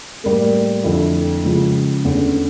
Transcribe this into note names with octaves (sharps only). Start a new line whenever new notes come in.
A2 G3 A#3
F2 D3 F3 A3 E4
C#2 C#3 F3 C#4 F4
E2 D3 A3 C#4